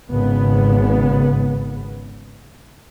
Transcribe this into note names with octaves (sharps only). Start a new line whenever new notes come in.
G#1 C#3 B3